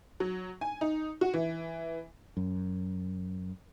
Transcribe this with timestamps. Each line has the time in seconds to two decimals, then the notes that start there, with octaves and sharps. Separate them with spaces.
0.20 F#3
0.61 G#5
0.81 D#4
1.21 F#4
1.34 E3
2.37 F#2